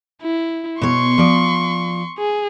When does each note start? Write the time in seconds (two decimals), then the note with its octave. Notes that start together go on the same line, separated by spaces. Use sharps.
0.22 E4
0.81 B2 C#5 C6 C#6
1.18 F3 D5
2.18 G#4